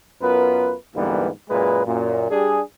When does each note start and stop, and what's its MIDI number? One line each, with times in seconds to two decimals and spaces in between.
0.21 0.74 42
0.21 0.74 59
0.21 0.74 65
0.21 0.74 70
0.21 0.74 71
0.94 1.28 38
0.94 1.28 44
0.94 1.28 52
0.94 1.28 55
0.94 1.28 58
0.94 1.28 59
1.49 1.85 42
1.49 1.85 46
1.49 1.85 56
1.49 1.85 68
1.49 1.85 71
1.85 2.25 42
1.85 2.25 46
2.29 2.60 55
2.29 2.60 62
2.29 2.60 67
2.29 2.60 68